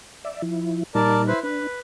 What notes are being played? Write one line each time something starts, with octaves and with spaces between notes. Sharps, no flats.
D5 E5
F3 E4
A#2 G3 D#4 A#4 D5 A5
E4 B4 C5
D4 B4